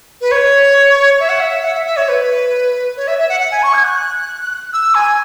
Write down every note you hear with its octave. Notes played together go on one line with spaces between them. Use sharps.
B4
C#5
E5
F#5
E5
F#5
E5
E5
C#5
B4
C#5
E5
E5
F#5
F#5
G#5
C#6
G#6
F#6
E6
G#5